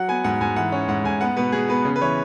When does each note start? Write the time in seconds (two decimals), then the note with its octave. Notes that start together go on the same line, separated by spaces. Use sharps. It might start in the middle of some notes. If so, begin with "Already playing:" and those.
Already playing: F#3 F#5
0.08 B3 G#5
0.24 G#2 F#5
0.41 G#2 G#5
0.56 E3 F#5
0.72 C#4
0.88 G#2 F#5
1.04 G#2 G#5
1.21 B3 F#5
1.37 B2 B4
1.52 B2 G#4
1.69 B3 B4
1.85 C#3
1.96 B4
2.01 E3 C#5